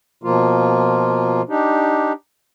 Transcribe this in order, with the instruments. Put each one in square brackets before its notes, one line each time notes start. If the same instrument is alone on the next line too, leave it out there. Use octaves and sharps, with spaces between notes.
[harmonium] B2 F3 A#3 F4
D4 D#4 G4